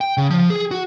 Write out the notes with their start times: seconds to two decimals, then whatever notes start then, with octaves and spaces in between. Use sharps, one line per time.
0.01 G5
0.17 C#3
0.30 F3
0.50 G#4
0.71 F#4